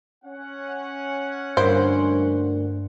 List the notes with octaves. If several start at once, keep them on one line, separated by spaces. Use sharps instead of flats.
C#4 F#5
D2 G2 A#3 E4 C5